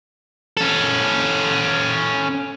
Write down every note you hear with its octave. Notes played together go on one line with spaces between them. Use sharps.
C#4 A4